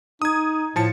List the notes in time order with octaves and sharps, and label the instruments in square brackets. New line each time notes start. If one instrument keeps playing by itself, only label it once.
[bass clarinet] D#4 [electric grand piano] D#6 G#6
[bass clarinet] A2 [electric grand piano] F3 A5 C#7